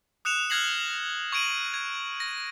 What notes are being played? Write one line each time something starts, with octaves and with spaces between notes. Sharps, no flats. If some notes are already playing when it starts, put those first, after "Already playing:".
D#6 F#6 C#7 E7 F7
F6 F#6 G#6 A#6 C7 F#7
C#6 G#6 D7 D#7 F#7
G#6
A#6